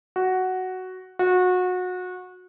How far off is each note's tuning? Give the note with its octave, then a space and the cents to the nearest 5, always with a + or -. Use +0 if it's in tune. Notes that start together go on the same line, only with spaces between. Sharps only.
F#4 +5
F#4 -25